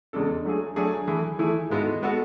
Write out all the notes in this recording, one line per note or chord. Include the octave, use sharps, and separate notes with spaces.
E2 C#3 G#3 D4 A4
F#3 A3 D4 G#4
F#3 A3 D4 G#4
E3 A3 E4 G#4
E3 A3 E4 G#4
G#2 G#3 B3 F#4 A4
G#3 B3 F#4 A4